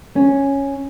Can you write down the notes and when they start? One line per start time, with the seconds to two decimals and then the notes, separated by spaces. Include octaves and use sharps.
0.16 C#4